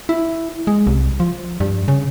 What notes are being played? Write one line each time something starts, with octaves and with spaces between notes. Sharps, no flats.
E4
G#3
C2
F3
G2
C#3